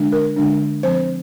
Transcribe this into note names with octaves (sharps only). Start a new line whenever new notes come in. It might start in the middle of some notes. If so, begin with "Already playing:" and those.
Already playing: D3 G#3 D4
A#4
D3 G#3 D4
F3 C4 C5